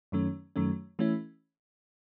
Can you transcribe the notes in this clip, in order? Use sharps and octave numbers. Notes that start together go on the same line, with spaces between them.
F#2 D#3 F#3 A3 C#4
F#2 D#3 F#3 A3 C#4
E3 A3 C#4 E4